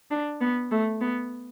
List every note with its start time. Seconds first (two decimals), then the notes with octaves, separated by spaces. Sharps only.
0.11 D4
0.41 B3
0.71 A3
1.01 B3